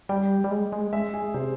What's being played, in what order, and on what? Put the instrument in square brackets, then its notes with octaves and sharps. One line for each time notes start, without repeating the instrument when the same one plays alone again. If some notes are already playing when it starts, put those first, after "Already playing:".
[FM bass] G3 [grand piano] G5
[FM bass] G3
G#3
G#3
[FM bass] G#3 [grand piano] E5
[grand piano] G#4
[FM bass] C3 [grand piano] C5